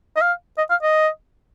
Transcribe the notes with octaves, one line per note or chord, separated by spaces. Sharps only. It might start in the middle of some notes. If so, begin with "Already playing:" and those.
D#5
F5
D#5
F5
D#5